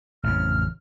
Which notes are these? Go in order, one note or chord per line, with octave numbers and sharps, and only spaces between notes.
A1 F2 C#3 F6